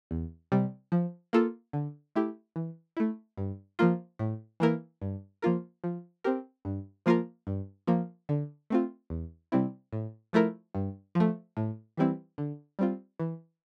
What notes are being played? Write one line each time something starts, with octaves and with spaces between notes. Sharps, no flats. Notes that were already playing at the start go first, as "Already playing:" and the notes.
E2
C3 G3
F3
A#3 F4 A4
D3
A3 E4 G4
E3
A3 E4
G2
F3 A#3 F4
A2
E3 A#3 E4 A#4
G2
F3 A#3 F4 A#4
F3
C4 G4 A#4
G2
F3 A#3 F4 A#4
G2
F3 A#3
D3
A3 C4 F4
E2
C3 G3 C4 E4
A2
F3 A3 E4 A#4
G2
F3
A3
A2
E3 G3 C4 E4
D3
G3 C4 F4
E3